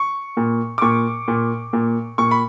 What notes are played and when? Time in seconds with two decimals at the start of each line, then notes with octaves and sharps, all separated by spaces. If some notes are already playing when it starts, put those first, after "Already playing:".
Already playing: C#6
0.37 A#2
0.78 D6
0.82 A#2 C#6
1.28 A#2
1.73 A#2
2.18 A#2 C#6
2.31 B5